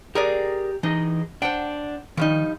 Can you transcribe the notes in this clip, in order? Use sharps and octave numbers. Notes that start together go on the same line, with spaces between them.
G4 G#4 A#4 D5 A#5
E3 D#4 G#4 D#5
D4 C5 F#5 G5
D#3 F3 G3 D#4